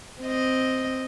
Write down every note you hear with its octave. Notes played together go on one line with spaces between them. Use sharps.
C4 D#5